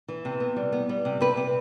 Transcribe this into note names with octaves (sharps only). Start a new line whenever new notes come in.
E3
C3
B3
G3
B3
G3
C3
C3 B4
C3